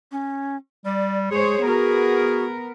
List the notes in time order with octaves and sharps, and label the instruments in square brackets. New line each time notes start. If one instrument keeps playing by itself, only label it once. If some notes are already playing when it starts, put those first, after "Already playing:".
[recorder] C#4
[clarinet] G3 [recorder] D5
[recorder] G#3 [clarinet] G#4 [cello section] C5 C#5
[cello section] B3 A#4 [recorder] F#4